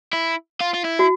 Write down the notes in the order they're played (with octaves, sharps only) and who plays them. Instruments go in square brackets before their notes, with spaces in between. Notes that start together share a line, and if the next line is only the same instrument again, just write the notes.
[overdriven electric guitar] E4
F4
F4
E4
[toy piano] F#4